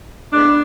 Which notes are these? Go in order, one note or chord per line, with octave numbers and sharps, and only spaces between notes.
A2 G#3 B3 D4